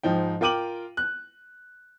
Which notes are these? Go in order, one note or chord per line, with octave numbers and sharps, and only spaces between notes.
G#2 F3 D#4 G5
F4 A#4 G5 D6 D#7 F#7
F#6